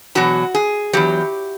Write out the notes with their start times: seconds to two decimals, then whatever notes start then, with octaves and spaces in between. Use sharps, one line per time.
0.15 E2 B2 F#3 F#4
0.55 G#4
0.93 E2 B2 F#3 G4